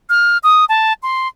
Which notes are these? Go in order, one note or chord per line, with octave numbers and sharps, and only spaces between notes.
F6
D#6
A5
C6